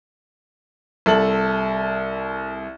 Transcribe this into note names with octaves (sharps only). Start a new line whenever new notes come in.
C2 A4 A5 F#7